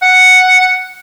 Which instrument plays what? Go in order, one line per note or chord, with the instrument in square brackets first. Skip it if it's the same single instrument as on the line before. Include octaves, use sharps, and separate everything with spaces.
[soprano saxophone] F#5